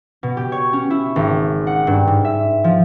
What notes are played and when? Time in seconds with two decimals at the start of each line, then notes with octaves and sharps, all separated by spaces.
0.23 B2
0.37 G4
0.52 C#5
0.73 C#4
0.90 E4
1.16 G#1
1.67 F#5
1.87 G2
2.07 G#2
2.25 E5
2.64 F3